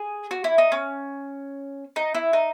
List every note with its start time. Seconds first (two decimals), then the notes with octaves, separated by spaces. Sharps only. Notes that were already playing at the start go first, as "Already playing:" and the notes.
Already playing: G#4
0.31 F#4
0.44 E4
0.58 D#4
0.72 C#4
1.96 D#4
2.15 E4
2.33 D#4